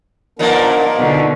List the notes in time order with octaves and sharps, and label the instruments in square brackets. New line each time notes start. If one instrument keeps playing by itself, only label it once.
[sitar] A#2 D#3 F3 [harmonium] B3 D4 A#4
[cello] B2 D3 [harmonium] D#4